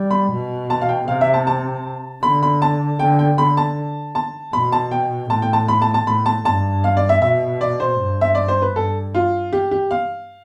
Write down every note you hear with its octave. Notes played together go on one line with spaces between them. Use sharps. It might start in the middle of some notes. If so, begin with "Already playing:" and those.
Already playing: G3
B5
B2
A5
F5
G5
C3 F5
E5
A5
A5
D3 B5
B5
A5
D3 G5
G5
D3 B5
A5
A5
B2 B5
A5
G5
A2 A5
G5
A5
B5
A5
A5
A2 B5
A5
G2 A5
F5
D5
E5
B2 E5
D5
C5
G2
E5
D5
C5
B4
G2 A4
F4
G4
G4
F5